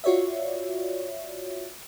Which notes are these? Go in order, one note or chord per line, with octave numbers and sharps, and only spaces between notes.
F4 F#4 C#5 D5 E5